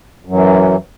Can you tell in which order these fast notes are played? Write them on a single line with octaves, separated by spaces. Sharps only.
F#2 F#3 E3